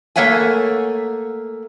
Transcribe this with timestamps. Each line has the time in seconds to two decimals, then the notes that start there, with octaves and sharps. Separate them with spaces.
0.16 A3 A#3 C#5 E5 F#5 G#5